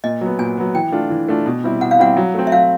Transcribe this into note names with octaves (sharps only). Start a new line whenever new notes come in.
A#2 D#5
F#3 B3
A#2 G#5
F#3 B3
E3 G5
A3 D4 F4
E3
A3 D4 F4
B2
G3 C4 E4
B2 F#5
F5
G3 C4 E4 F#5
F#3
A3 C4
E5
F#3 F5